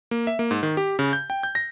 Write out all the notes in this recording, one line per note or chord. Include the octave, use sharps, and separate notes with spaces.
A#3
E5
A#3
G#2
D#3
G4
C#3
G6
G5
G6
A#6